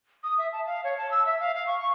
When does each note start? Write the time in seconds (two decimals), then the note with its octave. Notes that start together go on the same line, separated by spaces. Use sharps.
0.23 D#6
0.38 E5
0.53 A5
0.66 F5
0.84 C#5
0.98 A5
1.11 E6
1.26 E5
1.40 F5
1.55 F5
1.67 C#6
1.79 C#6